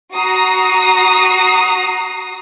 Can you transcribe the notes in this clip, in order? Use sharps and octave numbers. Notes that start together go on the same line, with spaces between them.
F#4 A#5 D#6 C7